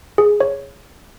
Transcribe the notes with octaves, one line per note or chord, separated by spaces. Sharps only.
G#4
C#5